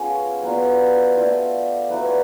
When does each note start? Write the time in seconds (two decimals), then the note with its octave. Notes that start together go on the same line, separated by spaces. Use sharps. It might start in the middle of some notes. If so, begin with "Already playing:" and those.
Already playing: G#3 B3 C#4 F4 A4
0.43 F#3 B3 D4 F4
1.16 A3 D4 F4
1.89 F#3 A3 D4 B4
2.04 C#5